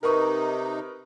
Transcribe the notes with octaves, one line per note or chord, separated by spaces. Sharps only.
C3 D#4 A#4 B4 C#6